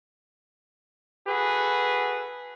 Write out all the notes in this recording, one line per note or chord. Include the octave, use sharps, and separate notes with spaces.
F#4 G#4 A4 B4